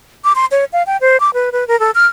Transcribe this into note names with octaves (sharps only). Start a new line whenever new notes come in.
D6
C6
C#5
F5
G5
C5
D6
B4
B4
A#4
A4
F6